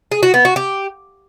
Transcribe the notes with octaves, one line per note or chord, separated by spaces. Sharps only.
G#4
F#4
B3
F#4
G4